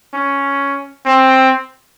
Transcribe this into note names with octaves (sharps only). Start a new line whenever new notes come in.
C#4
C4